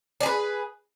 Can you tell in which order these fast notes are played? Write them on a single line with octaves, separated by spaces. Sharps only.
D5 G#4 B4